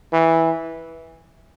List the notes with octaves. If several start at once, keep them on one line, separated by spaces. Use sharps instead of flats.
E3